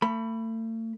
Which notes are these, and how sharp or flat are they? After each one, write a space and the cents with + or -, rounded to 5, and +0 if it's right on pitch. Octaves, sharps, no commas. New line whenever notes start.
A3 +40 B5 +0